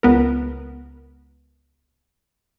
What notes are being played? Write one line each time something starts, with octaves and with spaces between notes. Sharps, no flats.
C#2 B3 A#4